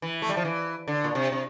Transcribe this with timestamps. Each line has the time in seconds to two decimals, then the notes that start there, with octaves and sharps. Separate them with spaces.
0.02 E3
0.22 A3
0.29 G3
0.37 F3
0.45 E3
0.88 D3
1.04 A#2
1.15 C3
1.32 C3